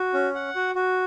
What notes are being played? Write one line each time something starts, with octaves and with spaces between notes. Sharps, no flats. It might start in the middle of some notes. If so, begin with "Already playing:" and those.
Already playing: F#4
C#4
F#5
F#4
F#4